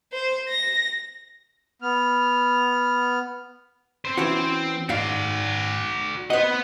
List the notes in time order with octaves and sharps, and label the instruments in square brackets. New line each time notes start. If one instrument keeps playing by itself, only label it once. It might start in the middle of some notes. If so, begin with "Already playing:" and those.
[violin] C5
A#6
[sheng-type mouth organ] B3 F6
[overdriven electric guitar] C4 C5
[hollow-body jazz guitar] E3 C#4 F#4
[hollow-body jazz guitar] G#2 F5 [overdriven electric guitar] F#4 D5
[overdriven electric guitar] B4 F#5 [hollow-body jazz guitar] C5 D#5